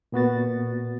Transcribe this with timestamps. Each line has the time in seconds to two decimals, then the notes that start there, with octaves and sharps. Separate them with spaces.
0.12 A#2 B3 F#4 A6